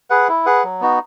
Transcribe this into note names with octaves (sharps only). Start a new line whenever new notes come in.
G#4 B4 F#5
E4
G#4 B4 F#5
F#3
B3 D#4 F#4